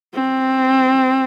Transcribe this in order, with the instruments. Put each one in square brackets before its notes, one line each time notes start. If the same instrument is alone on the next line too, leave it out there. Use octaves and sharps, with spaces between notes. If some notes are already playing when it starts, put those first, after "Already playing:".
[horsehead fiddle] C4